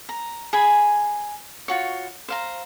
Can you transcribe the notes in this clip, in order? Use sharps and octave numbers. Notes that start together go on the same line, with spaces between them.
A#5
G#4 G#5 B5
F4 F#4 C#5
C5 F5 A#5